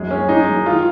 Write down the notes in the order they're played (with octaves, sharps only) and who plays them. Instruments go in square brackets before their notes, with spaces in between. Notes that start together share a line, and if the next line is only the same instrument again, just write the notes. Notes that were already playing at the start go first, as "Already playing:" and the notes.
Already playing: [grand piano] F#2 G#3
F#2 C#4
G#3 D#4
F#2
D#3 F4